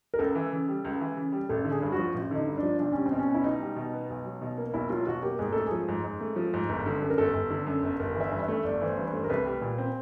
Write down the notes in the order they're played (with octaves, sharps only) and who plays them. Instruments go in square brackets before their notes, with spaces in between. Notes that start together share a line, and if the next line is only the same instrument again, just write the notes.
[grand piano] A#4
[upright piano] C#2 [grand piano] A4
[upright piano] E3
C#3
G3
C#2
E3
C#3
G3
[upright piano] A1 [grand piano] A4
[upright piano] D3
[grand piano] G#4
[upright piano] G2
[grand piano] F#4
[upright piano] F3
A1
[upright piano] D3 [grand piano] D#4
[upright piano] G2
[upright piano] F3 [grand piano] D4
[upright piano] B1 [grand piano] D4
[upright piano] G3 [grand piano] C#4
[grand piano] C4
[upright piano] B2
[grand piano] C#4
[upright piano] B3
[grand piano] E4
[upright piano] B1 [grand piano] D#4
[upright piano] G3
B2
B3
B1
F#3
B2
A#3
[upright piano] B1 [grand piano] E4
[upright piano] F#3 [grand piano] F4
[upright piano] B2 [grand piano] F#4
[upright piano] A#3 [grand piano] G4
[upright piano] G#2 [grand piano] G#4
[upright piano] A3 [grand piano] A4
[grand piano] G#4
[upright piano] F3
G#2
G#2
A3
F3
G#2
G1
D3
[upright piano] F#2 [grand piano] A4
[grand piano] A#4
[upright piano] G1 [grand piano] A4
[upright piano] G1
D3
F#2
G1
[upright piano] G1 [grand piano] A#4
[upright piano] E3
[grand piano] E5
[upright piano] G2
[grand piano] E5
[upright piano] A3
[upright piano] G1 [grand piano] D5
[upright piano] E3 [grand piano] C5
[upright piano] G2
[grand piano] C5
[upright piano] A3
[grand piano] A#4
[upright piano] C2 [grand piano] B4
[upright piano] G3
A#2
C4